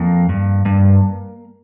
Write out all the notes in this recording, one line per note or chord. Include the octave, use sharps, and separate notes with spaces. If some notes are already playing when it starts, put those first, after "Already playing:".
Already playing: F2 A#3
G2
G2